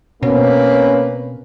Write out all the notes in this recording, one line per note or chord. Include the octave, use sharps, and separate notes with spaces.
B2 A#3 C4 C#4 B4